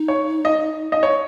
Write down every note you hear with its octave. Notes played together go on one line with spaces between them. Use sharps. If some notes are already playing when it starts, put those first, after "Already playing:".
Already playing: D#4
C#5
D#5
D#5
C#5